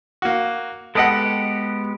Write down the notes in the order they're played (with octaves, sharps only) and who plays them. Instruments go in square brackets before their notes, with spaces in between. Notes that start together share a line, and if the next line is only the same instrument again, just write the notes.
[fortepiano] A#3 F#4
[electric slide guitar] G#3 B3 G4 [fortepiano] A4 D#5 F#5